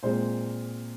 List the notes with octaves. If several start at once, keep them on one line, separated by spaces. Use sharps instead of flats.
A#2 G#3 C4 C5